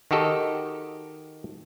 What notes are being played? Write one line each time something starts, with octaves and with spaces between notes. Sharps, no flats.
D#3 F#4 G4 A4 D#5